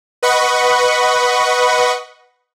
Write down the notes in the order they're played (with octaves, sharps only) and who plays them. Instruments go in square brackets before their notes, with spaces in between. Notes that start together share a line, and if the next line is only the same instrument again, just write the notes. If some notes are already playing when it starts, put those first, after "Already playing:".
[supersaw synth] B4 D#5 F#5 B5 C#6